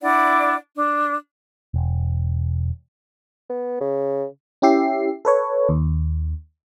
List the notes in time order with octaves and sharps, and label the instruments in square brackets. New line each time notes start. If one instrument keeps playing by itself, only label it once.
[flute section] D4 E4 D5 F#5
D4
[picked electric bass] E1
[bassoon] B3
C#3
[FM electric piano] C#4 E4 G4 E5 C7
A4 B4 C#5
D#2